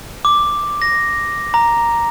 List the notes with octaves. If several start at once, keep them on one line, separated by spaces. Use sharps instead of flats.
D6
A#6
A#5